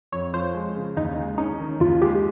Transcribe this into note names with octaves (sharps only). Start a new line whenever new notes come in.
F2 C#5
F3 C5
G#3
C#3
D#2 D#4
G#3
C#4 D#4
D#3
D#2 F4
G#3 G4